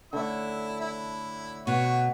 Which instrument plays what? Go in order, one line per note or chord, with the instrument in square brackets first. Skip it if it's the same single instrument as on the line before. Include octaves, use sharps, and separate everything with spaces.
[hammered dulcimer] D3 A3 C#5 [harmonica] E4 E5
[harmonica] E4
[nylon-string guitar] B2 [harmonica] F#4 C#5